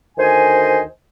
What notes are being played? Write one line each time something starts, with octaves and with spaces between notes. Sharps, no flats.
D2 D#3 C5 D#5 G#5